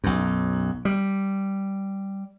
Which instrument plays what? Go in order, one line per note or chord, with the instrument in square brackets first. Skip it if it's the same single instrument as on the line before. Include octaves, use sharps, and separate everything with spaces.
[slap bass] B1 F#2
G3